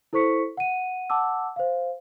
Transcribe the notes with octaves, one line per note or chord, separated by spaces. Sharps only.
E4 A4 C5 C#6 B6 C#7
F#5 D#7
F#5 A5 D6 E6
C5 F5